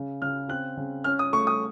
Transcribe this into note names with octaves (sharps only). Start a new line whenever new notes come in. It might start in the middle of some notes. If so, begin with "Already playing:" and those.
Already playing: C#3
C#3 F6
C4 F#6
C#3
C#4 F6
D#6
A3 C#6
D#6